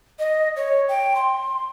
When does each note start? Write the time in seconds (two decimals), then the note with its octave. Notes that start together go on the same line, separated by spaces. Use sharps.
0.19 D#5
0.56 C#5
0.89 G5
1.15 C6